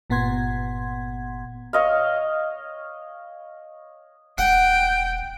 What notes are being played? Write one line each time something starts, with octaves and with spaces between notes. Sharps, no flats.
G1 A#2 B3 F#5 C6 G#6
C#5 D#5 F5
E1 F#5 G5